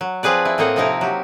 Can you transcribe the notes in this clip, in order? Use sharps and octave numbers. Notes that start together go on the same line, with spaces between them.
F#3
F3 C4 G#4 B4 D5
E4
A2 A#3 C4 D#5 F#5
C3 F3 D#4 E4 A#4
F#3 G4